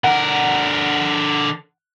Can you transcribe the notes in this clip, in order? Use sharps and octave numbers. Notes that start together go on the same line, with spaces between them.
D3 A#4 F#5